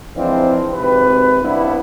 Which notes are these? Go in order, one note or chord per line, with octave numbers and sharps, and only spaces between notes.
E3 F3 G#3 C4 D4
G#1 C3 B4
G2 C3 B3 E4